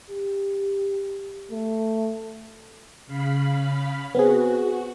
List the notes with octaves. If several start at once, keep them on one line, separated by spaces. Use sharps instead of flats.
G4
A3
C#3 F5 B5
B3 C4 F#4 G#4